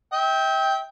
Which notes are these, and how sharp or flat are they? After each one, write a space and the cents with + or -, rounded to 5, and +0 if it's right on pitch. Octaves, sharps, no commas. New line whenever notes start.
E5 -40 G5 +0